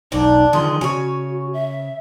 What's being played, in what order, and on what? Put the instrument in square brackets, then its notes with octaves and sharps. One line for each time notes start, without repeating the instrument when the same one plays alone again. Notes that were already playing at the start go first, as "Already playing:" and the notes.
[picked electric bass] E1 B1 [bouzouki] D4 [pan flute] D#4
[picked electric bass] D3 D#3 F3 [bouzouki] G#4 [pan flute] C6
[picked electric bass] C#3 [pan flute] F#4 [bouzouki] C#5 G#5
[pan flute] E5